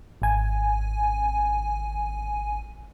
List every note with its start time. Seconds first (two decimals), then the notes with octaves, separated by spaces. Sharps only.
0.22 G#1 G#5